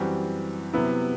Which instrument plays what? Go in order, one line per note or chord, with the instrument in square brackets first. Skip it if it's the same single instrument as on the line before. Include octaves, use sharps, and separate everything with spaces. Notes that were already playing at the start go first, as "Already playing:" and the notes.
Already playing: [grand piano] F#2 E3 G3 C4 F#4
C3 F#3 B3 E4